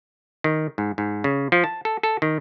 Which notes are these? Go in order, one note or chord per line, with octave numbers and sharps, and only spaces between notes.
D#3
G#2
G#2
C#3
F3
A5
A4
A4
D#3